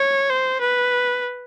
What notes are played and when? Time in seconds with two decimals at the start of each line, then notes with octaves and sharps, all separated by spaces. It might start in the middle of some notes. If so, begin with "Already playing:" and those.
Already playing: C#5
0.30 C5
0.61 B4